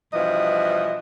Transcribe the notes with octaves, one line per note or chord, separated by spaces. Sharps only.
G2 B2 E3 F3 D#5